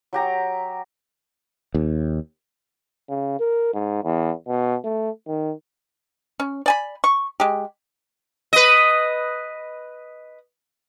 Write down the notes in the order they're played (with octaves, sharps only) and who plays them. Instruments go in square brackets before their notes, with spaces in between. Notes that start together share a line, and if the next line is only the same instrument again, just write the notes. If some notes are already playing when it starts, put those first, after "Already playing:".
[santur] F#3 G4 A#5
[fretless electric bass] D#2
[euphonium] C#3
A#4
G#2
E2
B2
A3
D#3
[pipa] C#4
D5 G#5 B5
C#6
G#3 G4
[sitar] B4 D#5